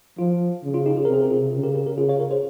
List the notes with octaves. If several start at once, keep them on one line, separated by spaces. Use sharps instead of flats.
F3 F4
C#3
F4
D#4 G4
G#4
C3 A#4
G#4
A#4
F4 G#4
C#3
G4 A#4
G4 A#4
G4 A#4
C#3 F4 G#4
C#5 F5
A#4 C#5
G#4 C5